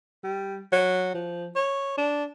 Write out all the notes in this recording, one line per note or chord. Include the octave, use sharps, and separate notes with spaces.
G3
F#3
F3
C#5
D4